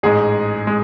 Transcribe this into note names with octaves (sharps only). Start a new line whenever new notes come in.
A1 G#2 G#3 G#4
G#3